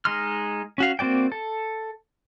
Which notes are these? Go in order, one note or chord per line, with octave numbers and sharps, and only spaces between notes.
G#3 D#4 C6 F6
C#4 F#4 F5
A#3 C4 F#4 D5 G5
A4